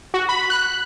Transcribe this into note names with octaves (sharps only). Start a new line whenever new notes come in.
F#4
B5
F#6